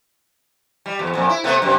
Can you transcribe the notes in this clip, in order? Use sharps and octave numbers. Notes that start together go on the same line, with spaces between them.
G3
E2
F2 A#2
E4
C3 A3 B3
F#2 C3